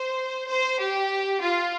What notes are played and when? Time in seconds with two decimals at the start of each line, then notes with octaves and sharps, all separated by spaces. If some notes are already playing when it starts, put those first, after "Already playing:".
Already playing: C5
0.48 C5
0.79 G4
1.40 F4